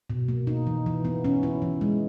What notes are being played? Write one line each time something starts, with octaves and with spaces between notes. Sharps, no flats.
B2
A#3
D#4
E3
E3
B3
C#4
E4
E3
G#3